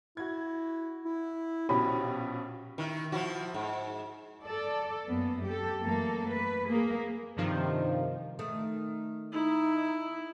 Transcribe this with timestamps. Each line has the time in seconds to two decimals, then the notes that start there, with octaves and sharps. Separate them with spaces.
0.17 E4 F#4 G#6
1.05 E4
1.69 A#1 B2 C#4 G4 B5
2.78 D#3 E4
3.12 F3 E4 F#4
3.54 G#2
4.43 A4 D5
5.06 F#2 A#3 B3
5.45 G4 A4
5.81 F#2 E3 A3 A#3 A4
6.31 B4
6.70 A#3 G#4
7.37 G2 C3 D#3 F3
8.39 D#3 A3
9.32 D#4 E4